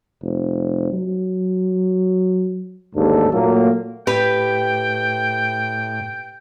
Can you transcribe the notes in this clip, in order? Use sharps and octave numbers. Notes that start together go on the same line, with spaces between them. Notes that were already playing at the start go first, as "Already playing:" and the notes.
F1
F#3
A1 D#2 G#2 D4 A4
A#2 F#3 A3 A#3
A2 G4 B4 G5